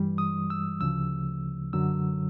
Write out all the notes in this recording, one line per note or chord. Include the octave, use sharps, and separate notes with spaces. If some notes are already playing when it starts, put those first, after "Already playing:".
Already playing: G2 E3 G3
D#6
E6
D2 C#3 F3 E6
F#2 D3 F#3 E6